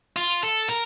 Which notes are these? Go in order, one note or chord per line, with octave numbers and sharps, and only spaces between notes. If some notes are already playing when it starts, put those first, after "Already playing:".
F4
A4
A#4